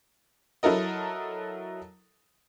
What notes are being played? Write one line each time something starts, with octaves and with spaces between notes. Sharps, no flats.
F#3 E4 A4 A#4 D#5